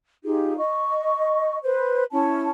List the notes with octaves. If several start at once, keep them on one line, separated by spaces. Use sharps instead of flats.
D#4 F4 G4 G#4
D#5 C#6
B4 C5
C#4 E4 A5